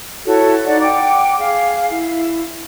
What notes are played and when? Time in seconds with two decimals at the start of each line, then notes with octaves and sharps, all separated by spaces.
0.26 E4 F#4 A4 C#5
0.66 D#4 D5 F#5
0.80 F#5 G5 D6
1.39 G#4 F5
1.90 E4